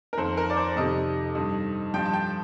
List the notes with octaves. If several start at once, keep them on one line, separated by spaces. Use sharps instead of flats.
A#4
F2 D#3 C5
A#4
D5
C5
F2 C3 D#3 D#5
G2 D#3
G2 F3 G5
A5
G5